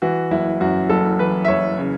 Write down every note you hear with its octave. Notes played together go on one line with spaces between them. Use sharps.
E3 F#4
F#1 E4
F#2 F#4
F#1 A4
E3 B4
E5
F#1 C#5
C#3